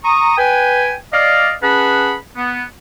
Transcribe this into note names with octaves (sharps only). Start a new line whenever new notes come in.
A#5 C#6 D#6
B4 G5 G#5
D5 D#5 F5
C#4 G#4 B4 F#5 A5 B5
B3